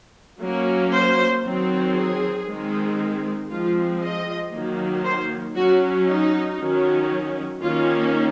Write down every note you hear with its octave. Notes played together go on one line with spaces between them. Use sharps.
F#3 A#3 C#4
C5
D#3 F#3 C4
G#4
D#3 G#3 C4
F3 G#3 C4 F4
D#5
D#3 F#3 A#3
C5
F#3 C#4 F#4
D#4
D#3 F#3 C#4
D#3 A#3 C#4 F4